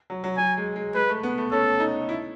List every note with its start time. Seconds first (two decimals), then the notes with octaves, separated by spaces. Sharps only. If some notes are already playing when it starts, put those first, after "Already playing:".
0.10 F#3
0.24 F#3
0.37 F#3 G#5
0.57 G#3
0.76 G#3
0.95 G#3 B4
1.09 A3
1.23 B3
1.38 A3
1.52 C#4 A4
1.80 D#4
2.09 E4